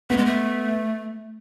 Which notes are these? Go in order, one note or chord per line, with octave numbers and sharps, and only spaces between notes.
A3 B3
G#3
A3